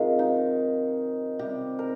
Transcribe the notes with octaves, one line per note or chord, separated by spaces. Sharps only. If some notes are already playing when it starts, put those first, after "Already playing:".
Already playing: C3 D#3 G#3 F4
D#4
C3 G3 G4
A#4